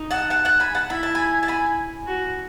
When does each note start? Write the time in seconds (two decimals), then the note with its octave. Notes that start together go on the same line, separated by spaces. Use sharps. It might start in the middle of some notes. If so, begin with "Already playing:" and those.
Already playing: D#4
0.11 F#5 A5
0.30 F#5 A5
0.45 F#5 A5
0.60 G#5 B5
0.75 F#5 A5
0.89 E4 B5
1.03 A5
1.15 G#5 B5
1.43 A5
1.48 G#5 B5
2.07 F#4